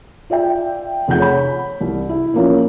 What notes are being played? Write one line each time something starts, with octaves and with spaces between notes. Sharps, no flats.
F4 D5 E5 G5
F1 C3 F4 G#4 F#5 G6
C#5 B5
C2
E4
A#2 F3 A#3 C#4